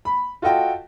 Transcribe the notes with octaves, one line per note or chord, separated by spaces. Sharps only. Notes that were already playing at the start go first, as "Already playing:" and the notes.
B5
F4 F#4 A4 D#5 G5 A5